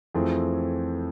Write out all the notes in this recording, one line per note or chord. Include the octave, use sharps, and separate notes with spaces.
F2 E3 A3 C4 G#4